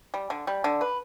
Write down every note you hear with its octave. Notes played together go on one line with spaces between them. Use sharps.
G3
D3
G3
D3
B4